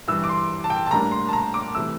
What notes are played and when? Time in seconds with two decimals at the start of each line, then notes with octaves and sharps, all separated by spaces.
0.08 G2 E3 G3 E6
0.24 D6
0.29 C6
0.64 A5
0.70 G5
0.86 A5
0.91 A2 G3 A#3 D4 A#5
1.12 C6
1.29 A5
1.33 A#5
1.54 D6
1.74 C3 E3 A3 E6